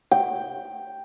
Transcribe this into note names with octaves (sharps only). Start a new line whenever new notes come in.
G5